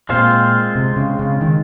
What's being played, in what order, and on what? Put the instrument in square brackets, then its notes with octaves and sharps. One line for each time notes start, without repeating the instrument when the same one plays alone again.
[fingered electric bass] A#2 [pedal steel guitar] G#3 C4 F4 C5 F5
[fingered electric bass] C3
C#3
C#3
D#3